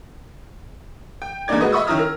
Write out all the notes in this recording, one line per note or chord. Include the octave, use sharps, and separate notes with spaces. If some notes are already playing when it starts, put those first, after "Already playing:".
G5
E2 G2 A#3 D#4 D5 G#6
G#3 F#4 B4 D#5
D#5 E5 B5 C#6 D#6 E6
D#3 C#4 E4 A#5 D#6 F6
A#4